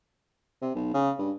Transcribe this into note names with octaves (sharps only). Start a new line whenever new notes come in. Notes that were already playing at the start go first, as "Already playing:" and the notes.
C3
B1
C#3
G2